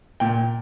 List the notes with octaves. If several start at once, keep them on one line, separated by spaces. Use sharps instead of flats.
A#2 G5